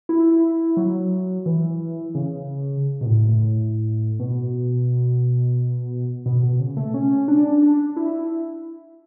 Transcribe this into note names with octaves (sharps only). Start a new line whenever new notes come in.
E4
F#3
E3
C#3
B2
A2
A2
B2
B2
B2
C#3
A3
C#4
D4
D4
E4